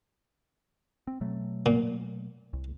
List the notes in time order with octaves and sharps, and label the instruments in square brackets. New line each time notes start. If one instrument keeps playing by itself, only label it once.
[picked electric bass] C4
B2 F#3 A3
[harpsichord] A#2
[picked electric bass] C2